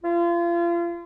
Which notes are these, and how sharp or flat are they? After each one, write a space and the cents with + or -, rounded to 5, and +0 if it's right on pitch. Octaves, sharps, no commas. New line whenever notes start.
F4 -35